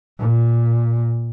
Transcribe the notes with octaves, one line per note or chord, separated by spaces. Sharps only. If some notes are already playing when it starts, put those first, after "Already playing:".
A#2